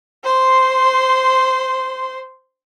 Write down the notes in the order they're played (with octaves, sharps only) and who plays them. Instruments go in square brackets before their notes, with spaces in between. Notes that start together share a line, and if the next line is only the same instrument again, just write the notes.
[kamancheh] C5 C6